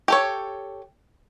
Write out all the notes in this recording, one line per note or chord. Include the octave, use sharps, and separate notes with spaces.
G4 A4 C#5